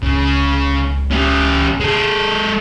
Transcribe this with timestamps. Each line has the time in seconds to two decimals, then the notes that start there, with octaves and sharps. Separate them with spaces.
0.03 C#2 C#3
1.11 C#4 G4
1.80 G#3 A4